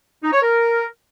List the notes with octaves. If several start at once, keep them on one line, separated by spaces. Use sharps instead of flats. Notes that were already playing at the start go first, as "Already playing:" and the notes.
D#4
C#5
A#4